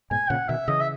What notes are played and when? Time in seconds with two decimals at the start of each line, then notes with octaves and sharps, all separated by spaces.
0.11 G#2 B2 G#5
0.30 A#2 C#3 F#5
0.49 B2 D#3 E5
0.68 C#3 E3 D#5
0.81 E5